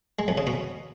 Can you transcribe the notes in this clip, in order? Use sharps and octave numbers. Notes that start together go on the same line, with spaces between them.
G#3
F2
C#3
B2